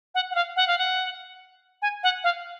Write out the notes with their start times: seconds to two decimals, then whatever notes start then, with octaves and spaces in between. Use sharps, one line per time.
0.15 F#5
0.31 F#5
0.35 F5
0.56 F#5
0.68 F5
0.78 F#5
1.82 G#5
2.03 F#5
2.24 F5